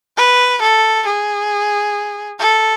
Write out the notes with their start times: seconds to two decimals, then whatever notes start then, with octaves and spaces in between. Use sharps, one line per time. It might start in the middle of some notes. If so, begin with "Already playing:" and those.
0.17 B4
0.62 A4
1.06 G#4
2.40 A4